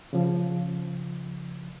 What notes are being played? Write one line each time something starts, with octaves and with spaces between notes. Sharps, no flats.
C#3 F3